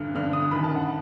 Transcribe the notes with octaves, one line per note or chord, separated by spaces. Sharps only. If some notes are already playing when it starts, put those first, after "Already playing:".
Already playing: G2 D3 F6
G2 D3 F6
D#6
F#2 D#3 B5
A5
F#5